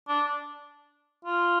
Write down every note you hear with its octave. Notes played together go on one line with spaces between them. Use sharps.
D4
F4